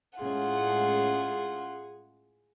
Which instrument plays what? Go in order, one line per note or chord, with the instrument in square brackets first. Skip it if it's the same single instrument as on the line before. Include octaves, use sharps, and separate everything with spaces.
[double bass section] A2 G#3 C#4 [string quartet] F4 F#5 [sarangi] G#4